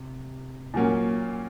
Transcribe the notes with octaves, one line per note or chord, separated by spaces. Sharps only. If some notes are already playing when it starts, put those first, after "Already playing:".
Already playing: C3
A#2 F#3 A#3 C#4